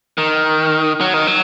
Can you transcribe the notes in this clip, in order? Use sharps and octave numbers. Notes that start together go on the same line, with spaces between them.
D#3
F#3
D#3
F#3